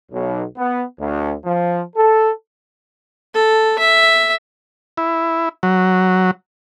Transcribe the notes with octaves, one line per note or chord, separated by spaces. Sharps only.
B1
B3
D2
F3
A4
A4
E5
E4
F#3